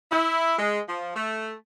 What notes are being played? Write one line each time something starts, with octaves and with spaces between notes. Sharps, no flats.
E4
G#3
F3
A3